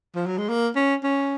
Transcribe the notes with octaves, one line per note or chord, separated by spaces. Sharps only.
F3
F#3
G#3
A#3
C#4
C#4